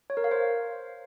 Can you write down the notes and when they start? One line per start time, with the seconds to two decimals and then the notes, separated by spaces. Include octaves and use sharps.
0.10 C#5
0.17 A#4
0.24 F5
0.31 C5